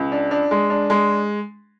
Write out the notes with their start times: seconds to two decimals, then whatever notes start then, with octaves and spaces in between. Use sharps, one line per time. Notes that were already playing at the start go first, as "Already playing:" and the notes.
Already playing: C#2
0.12 D4
0.31 D4
0.51 G#3
0.70 D4
0.90 G#3